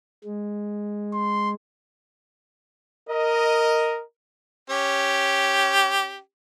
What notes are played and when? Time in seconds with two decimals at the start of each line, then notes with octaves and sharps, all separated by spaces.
0.25 G#3
1.13 C6
3.09 A#4 D#5
4.70 C#4 G4